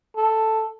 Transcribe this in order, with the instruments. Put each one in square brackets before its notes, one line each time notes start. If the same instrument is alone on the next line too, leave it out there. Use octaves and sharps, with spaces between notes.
[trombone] A4